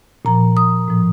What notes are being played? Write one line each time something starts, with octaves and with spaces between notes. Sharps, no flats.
A#2 F3 A#5
D#6
A2 F3